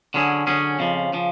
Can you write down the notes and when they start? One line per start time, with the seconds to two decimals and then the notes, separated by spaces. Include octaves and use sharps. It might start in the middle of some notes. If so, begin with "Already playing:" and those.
0.14 D3 F#3 C#4 G#4
0.47 D3 F#3 C#4 G#4
0.79 F2 C#3 F3
1.13 C#3 F3